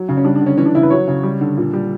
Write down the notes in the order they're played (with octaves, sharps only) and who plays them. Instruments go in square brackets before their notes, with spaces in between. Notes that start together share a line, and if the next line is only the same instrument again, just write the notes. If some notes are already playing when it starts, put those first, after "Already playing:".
Already playing: [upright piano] F#3
C#3
C#4
G3 D4
D4
D3
C#4
E3 C#4
D4
C#3 E4
B4
F#3 C#5
C#3
G3
D3
A#2
G3